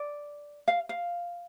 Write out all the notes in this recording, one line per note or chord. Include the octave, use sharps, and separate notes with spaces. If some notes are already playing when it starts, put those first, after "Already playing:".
Already playing: D5
F5
F5